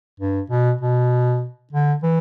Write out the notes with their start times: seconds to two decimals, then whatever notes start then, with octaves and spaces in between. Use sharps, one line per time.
0.20 G2
0.50 B2
0.81 B2
1.72 D3
2.03 E3